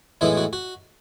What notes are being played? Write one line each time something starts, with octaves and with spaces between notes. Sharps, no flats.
A2 E3 G#3 B3 E4
F#4
F#4